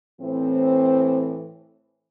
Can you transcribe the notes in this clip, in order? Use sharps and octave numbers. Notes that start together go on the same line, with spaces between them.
A2 E3 C4